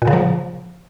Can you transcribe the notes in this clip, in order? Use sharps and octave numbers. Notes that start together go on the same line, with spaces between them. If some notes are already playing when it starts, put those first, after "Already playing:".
A#2
C#3
F3